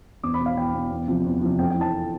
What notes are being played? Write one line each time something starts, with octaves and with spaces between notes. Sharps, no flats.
E2 D6
B5
B2
F5
E2 G5
B2
E2
C3 F3
E2
C3 F3
F2 G5
G5
E3
A5